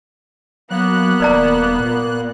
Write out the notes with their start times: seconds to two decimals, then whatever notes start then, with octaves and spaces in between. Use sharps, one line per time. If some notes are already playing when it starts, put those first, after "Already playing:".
0.71 F#3 A#3 B3 F#6
1.20 D#1 B4 D5 A#5
1.78 A#2